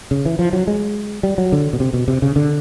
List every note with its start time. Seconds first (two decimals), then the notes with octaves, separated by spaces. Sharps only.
0.11 C#3
0.26 E3
0.39 F3
0.53 F#3
0.67 G#3
1.23 G3
1.38 F#3
1.52 D3
1.73 B2
1.80 C3
1.94 B2
2.08 C3
2.22 C#3
2.36 D3